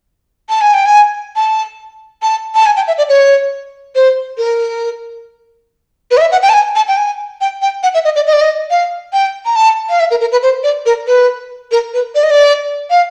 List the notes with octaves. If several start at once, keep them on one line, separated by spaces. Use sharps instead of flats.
A5
G#5
G5
G#5
A5
A5
A5
G#5
G5
E5
D5
C#5
C5
A#4
B4
D#5
E5
F#5
G5
A5
G#5
A5
G5
G#5
G5
G5
F#5
E5
D#5
D5
D#5
D5
D#5
F5
G5
A#5
A5
F5
E5
A#4
A#4
B4
C5
D5
A#4
B4
A#4
B4
D5
D#5
D5
F5